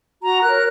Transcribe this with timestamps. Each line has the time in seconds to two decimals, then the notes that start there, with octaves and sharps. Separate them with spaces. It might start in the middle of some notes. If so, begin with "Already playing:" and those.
0.23 F#4 A#5
0.43 A#4 C#5 F#6